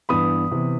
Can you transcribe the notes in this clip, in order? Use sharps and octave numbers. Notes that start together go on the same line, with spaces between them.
G2 E3 B3 B5 D#6
C3 E3 B3